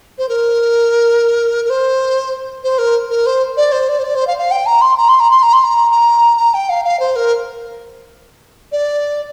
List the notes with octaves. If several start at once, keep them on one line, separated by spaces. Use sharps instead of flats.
C5
A#4
A#4
C5
C5
A#4
A#4
C5
D5
C5
D5
C5
D5
C5
F5
F5
G5
A#5
C6
A#5
C6
A#5
C6
A#5
C6
A#5
A#5
A#5
G5
F5
F5
C5
A#4
D5